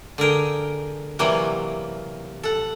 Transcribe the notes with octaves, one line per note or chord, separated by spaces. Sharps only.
D3 G#4 A#4 G5
C3 E3 F#3 G3 A#3 A#4
A4 F#5